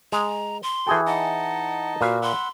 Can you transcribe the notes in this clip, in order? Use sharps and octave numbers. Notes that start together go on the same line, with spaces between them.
G#3 A#5
C6
E3 F#4 G#4 A4 G5
D#4 D#5 F#5 A5
A#2 F#4 B4 F5
F#5 B5 C6 E6